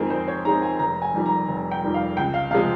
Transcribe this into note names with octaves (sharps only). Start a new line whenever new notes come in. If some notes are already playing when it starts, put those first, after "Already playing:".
Already playing: F2 D#3 G#3 C4 G#4 A#4
F2 C5
C#5
D#3 G#3 C4 A#5
G#5
F1 A#5
G#5
F2 D#3 G3
A#5
F1
G5
F2 D#3 G3
F5
C#2 G5
F5
C3 F3 G#3 C4 F5